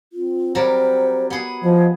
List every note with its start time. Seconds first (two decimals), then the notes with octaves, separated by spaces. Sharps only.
0.13 C4 F4
0.55 F#3 G3 A#4 C5
1.30 B3 G#4
1.64 F3 D#5